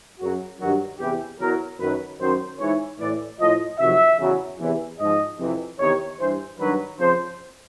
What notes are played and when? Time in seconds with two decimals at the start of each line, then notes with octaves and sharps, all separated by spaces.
0.19 F#2 C#3 F#3 F#4
0.59 G2 D#3 F#3 F#4
0.99 E2 C3 E3 G4
1.40 E2 B2 F#3 A#4
1.79 F#2 D#3 F#3 B4
2.19 F#2 D#3 F#3 C5
2.59 G#2 E3 C#5
2.99 A2 E3 D5
3.40 A2 F3 D#5
3.79 F2 C3 D#3 F#3 E5
4.20 E2 C#3 F#3
4.59 E2 C3 E3
4.99 G#2 F3 D#5
5.39 F2 C3 E3
5.80 E2 C3 D#3 C#5
6.19 G2 E3 C5
6.59 G2 D#3 F#3 B4
6.98 F2 C#3 F3 C5